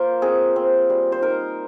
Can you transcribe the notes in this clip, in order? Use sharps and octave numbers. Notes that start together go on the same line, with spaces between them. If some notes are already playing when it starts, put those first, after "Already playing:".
Already playing: A#3 F4 A#4 C5
C4 G#4
C4
G3
C5
D#4 A#4